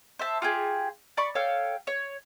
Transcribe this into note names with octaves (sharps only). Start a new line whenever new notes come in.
C5 E5 A5
F4 G4 G#4
D5 B5 C#6
A4 C#5 F5 G5
C#5